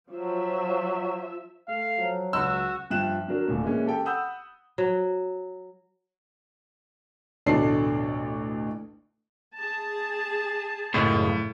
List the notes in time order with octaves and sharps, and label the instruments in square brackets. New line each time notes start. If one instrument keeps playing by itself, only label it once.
[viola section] F3 E5 [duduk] F#3
[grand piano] A3 A4 [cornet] F5
[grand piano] F3 [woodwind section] F#3
[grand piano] C#2 [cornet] F#4 [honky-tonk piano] E6
[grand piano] G2 F3 E5 G5 F#6 E7
F#3 D4 A#4
D#1 A2
A#2 E3 G#3 C#4
G4 A4 G5
F#5 B5 D#6 E6 G6
[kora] F#3
[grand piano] A1 D2 B2 D4 A4 C7
[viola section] G#4 A5
[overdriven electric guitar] C#2 F#2 [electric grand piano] A2